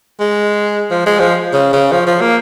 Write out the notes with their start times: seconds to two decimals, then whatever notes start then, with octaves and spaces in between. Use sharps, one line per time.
0.20 G#3
0.91 F3
1.06 G#3
1.20 F3
1.53 C#3
1.73 C#3
1.92 F3
2.07 F3
2.21 A#3